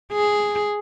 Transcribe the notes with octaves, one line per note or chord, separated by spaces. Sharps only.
G#4